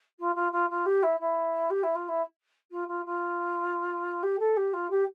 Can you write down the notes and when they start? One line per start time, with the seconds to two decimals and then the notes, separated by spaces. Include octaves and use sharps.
0.19 F4
0.35 F4
0.52 F4
0.70 F4
0.86 G4
1.03 E4
1.20 E4
1.70 G4
1.83 E4
1.95 F4
2.08 E4
2.71 F4
2.88 F4
3.05 F4
4.23 G4
4.39 A4
4.57 G4
4.73 F4
4.90 G4